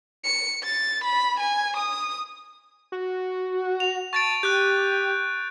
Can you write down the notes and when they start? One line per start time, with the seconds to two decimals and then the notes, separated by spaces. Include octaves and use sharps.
0.24 C#7
0.63 A6
1.04 B5
1.39 G#5
1.76 D#6
2.92 F#4
3.80 F7
4.13 A5 C#6 A6 D7
4.43 G4 F#6 G6